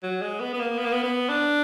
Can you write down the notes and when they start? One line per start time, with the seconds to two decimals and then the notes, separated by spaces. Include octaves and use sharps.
0.03 F#3
0.22 G#3
0.40 B3
0.54 B3
0.60 A#3
0.78 B3
0.85 A#3
0.93 B3
1.03 B3
1.29 D4